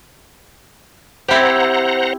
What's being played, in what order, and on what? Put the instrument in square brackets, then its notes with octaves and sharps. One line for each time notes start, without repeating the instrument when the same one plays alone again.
[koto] C4 E4 G4 [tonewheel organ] C5 F#5 A#5